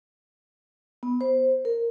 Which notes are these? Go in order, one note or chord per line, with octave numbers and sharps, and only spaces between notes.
B3
C5
A#4